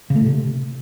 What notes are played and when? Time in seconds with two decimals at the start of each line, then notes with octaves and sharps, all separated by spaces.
0.10 C#3
0.15 A3
0.21 A2
0.26 C3